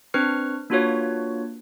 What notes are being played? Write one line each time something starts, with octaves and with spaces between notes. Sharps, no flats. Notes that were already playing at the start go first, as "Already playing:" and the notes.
C4 D4 B4 C#6 F6 C#7
A#3 D4 F4 F#4 B4 C#5